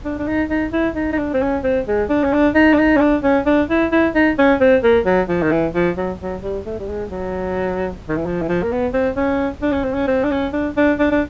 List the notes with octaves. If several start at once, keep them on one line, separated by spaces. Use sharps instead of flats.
D4
D4
D#4
D#4
E4
D#4
D#4
D4
C4
C#4
C4
G#3
D4
C#4
D4
D#4
D4
D#4
C#4
D4
C#4
D4
E4
E4
D#4
C#4
C4
A#3
F#3
F3
D#3
E3
F3
F#3
F#3
G3
A3
G3
G#3
F#3
D#3
E3
F3
E3
F3
A#3
B3
C4
C#4
D4
C#4
C4
C#4
C4
D4
C#4
D4
D4
D4
D4